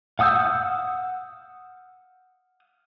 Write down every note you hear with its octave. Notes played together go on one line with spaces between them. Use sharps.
F5 F#5 D#6 E6 G6